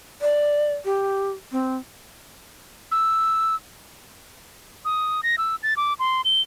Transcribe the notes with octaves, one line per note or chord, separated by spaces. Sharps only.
D5
G4
C4
E6
D#6
A#6
E6
A6
D6
C6
G7